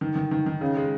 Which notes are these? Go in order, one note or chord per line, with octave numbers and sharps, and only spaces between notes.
D#3
D#3
D#3
D#3
C#3
G#3